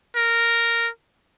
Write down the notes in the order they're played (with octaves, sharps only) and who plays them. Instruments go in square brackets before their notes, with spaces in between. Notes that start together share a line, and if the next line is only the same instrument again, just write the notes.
[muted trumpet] A#4